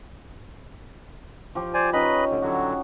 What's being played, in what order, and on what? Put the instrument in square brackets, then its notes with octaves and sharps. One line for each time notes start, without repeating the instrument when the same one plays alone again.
[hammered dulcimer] F3 G4
[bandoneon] C5 D5 G#5
[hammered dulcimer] C#4 D#4 G4 [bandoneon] B4 D#5 B5
[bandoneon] D2 D3
[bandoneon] D3 F#3 [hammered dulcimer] F#4